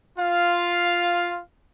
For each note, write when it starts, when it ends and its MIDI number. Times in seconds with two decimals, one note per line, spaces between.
0.17 1.40 65
0.17 1.40 77